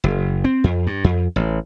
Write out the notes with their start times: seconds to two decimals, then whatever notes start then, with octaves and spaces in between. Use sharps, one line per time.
0.04 F#1
0.44 C4
0.64 F2
0.87 G2
1.04 F2
1.36 A1